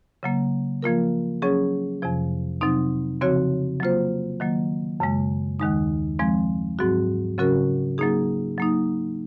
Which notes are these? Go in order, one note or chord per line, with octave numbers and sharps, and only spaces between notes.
C#3 F#3 A#3
F3 A#3 F4 A#4
F#3 C#4 G#4 C#5
F2 C3 F3
C3 F#3 C4 D#4
C#3 F3 C4 F#4 C#5
F#3 A#3 F4 C5
D#3 F#3 A#3
F#2 C#3 G#3
D#2 D#3 G#3 D#4
F3 G#3 C4
G#2 F#3 C4 F#4
C#3 F#3 C#4 F#4 A#4
F#3 A#3 D#4 G#4
F#3 A#3 D#4